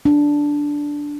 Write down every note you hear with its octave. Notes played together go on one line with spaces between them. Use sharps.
D4